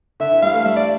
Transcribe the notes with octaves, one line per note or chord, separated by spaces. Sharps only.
D3 E5
E3
G3 F5
A3
G3 E5
D5